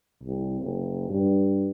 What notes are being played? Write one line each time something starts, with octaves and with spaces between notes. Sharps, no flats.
C2
F#1
G2